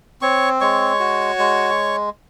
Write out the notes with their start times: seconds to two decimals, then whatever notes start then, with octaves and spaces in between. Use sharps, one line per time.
0.22 C4 C#5 C#6
0.61 G#3 C#5 C#6
1.00 F#4
1.39 G#3